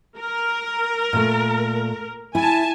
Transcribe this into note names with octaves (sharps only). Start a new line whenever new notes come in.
A#4
A#2 A3
E4 G#5 A5